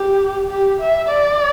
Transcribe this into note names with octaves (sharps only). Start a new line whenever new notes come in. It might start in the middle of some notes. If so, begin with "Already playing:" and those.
Already playing: G4
G4
E5
D5